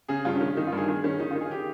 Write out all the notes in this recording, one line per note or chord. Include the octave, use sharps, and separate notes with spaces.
C#3 G#4
G2 F4
C#4
D#3
D#3 D#4
G2 F4
G#4
D#3 G#4
D#3 C#4
D#3 D#4
D#3 F4
G#4
G4